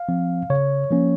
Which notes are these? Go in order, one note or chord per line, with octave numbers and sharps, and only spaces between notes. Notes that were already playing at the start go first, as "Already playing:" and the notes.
Already playing: F5
F3 C4
C#3 C#5
F3 A#3 C#4